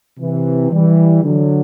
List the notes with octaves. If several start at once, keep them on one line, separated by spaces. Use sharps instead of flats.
C3 E3
E3 G3
D3 F#3